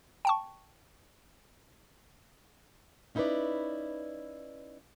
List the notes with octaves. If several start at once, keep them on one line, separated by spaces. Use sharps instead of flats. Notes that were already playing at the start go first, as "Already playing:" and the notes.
G5 A5 C#6
C#4 D#4 E4 G#4 B4 D5